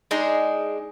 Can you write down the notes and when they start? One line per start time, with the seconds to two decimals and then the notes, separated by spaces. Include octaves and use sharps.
0.11 G#3 D4 D#4 G#4